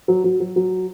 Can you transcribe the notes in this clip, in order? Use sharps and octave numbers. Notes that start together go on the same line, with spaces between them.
F#3
F#3
F#3
F#3